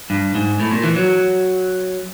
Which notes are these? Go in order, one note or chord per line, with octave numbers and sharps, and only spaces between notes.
G2
G#2
A2
A#2
E3
F#3